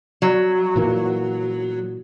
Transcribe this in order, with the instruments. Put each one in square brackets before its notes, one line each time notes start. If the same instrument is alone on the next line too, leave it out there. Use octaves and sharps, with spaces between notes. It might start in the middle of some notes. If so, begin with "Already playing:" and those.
[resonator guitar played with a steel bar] F#3
[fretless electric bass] A#2 E3 A#3